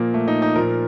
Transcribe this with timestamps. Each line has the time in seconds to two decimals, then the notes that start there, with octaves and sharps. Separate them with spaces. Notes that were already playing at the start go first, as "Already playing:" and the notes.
Already playing: A#2 F3 A#3
0.14 A3
0.28 D#4
0.42 D#4
0.56 A#2 F3 A#4